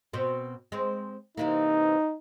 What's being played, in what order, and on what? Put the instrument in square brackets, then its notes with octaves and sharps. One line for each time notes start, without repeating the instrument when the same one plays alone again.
[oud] B2 C4
G#3 C4
[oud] C3 E3 A#3 [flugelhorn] D#4